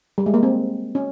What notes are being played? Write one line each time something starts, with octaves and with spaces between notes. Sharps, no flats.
G3
G#3
A#3
C4
C#4